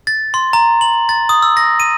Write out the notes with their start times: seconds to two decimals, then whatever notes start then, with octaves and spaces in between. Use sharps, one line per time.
0.07 A6
0.34 C6
0.53 A#5
0.81 F#7
1.09 A6
1.29 D#6
1.42 E6
1.57 A#6
1.80 D#7